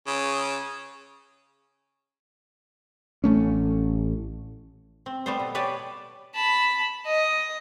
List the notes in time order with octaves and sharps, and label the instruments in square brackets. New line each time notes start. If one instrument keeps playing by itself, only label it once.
[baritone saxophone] C#3
[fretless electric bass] A1 A3 C#4
[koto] C4
G3 A3 B3 A4 C5
B2
G4 B4 C#5 D5 G#5 A5
[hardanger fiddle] A5 B5
D#5